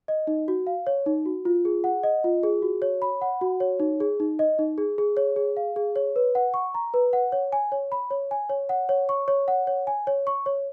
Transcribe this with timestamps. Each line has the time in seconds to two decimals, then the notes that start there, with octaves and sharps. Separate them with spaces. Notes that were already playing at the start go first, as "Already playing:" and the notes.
0.08 D#5
0.27 D#4
0.48 F#4
0.67 F5
0.87 C#5
1.06 D#4
1.26 F#4
1.45 F4
1.65 G#4
1.84 F#5
2.03 D#5
2.24 F4
2.43 G#4
2.62 F#4
2.82 C#5
3.02 B5
3.21 F#5
3.41 F#4
3.60 C#5
3.80 D#4
4.00 G#4
4.20 D#4
4.39 D#5
4.59 D#4
4.78 G#4
4.98 G#4
5.17 C#5
5.36 G#4
5.57 F5
5.76 G#4
5.96 C#5
6.16 B4
6.35 F#5
6.54 C#6
6.74 A#5
6.94 B4
7.13 F#5
7.32 C#5
7.52 G#5
7.72 C#5
7.92 B5
8.11 C#5
8.31 G#5
8.50 C#5
8.69 F#5
8.89 C#5
9.09 C#6
9.28 C#5
9.48 F#5
9.67 C#5
9.87 G#5
10.07 C#5
10.27 C#6
10.46 C#5